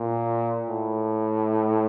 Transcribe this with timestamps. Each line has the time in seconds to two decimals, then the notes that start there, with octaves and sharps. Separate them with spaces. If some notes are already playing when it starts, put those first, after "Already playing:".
Already playing: A#2
0.69 A2